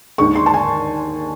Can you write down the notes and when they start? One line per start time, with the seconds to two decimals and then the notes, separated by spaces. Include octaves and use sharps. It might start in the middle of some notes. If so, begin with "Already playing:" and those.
0.18 D#2 D#3 G#3 C#6
0.35 C6
0.46 A5
0.54 G#5